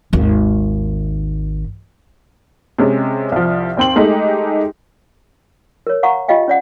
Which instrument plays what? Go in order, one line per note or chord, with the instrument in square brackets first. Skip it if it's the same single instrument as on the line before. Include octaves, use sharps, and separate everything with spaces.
[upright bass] G#1 D#2
[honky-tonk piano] C3 G#3 C#4
C2 F3
D#2 C4 G5 C6 F#7
G#3 A3 D#4 G4
[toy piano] A#4 C#5
F5 F#5 A#5 C#6
F4 G4 D#5 F5 G5
C#4 D5 F#5